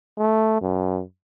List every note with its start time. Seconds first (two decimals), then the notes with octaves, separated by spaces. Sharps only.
0.18 A3
0.62 F#2